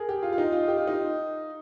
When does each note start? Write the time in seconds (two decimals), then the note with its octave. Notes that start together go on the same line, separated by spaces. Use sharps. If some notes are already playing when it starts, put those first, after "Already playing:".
Already playing: G#4 A#4
0.09 G4
0.23 F4
0.33 F4
0.38 D#4
0.52 F4
0.68 G4
0.77 F4
0.87 D#4